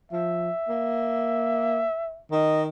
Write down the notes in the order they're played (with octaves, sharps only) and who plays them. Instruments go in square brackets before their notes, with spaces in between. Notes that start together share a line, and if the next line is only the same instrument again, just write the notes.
[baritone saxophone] F3 [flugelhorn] E5
[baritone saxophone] A#3
[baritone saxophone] D#3 [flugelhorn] D#5